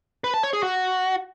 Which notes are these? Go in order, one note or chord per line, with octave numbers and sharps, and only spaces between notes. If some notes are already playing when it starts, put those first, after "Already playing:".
B4
A5
C#5
G#4
F#4